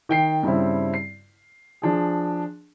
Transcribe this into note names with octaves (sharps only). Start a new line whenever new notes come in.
D#3 G5 C7
G2 C#3 C4 E4
C7
F3 D4 G#4